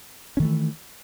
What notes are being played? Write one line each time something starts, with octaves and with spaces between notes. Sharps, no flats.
D#3 E3 A3 C#4